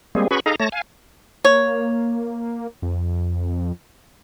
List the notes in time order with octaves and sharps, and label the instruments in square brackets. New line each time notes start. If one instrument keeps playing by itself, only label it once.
[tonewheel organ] G3 G#3 A#3 C4 G#4
C#4 F#4 G#4 B4 B5 C#6
D#4 G#4 A4 D#5 F5 A#5
A3 C#5 A5 A#6
F5 G#5
[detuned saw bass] A#3 [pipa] C#5
[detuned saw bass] F2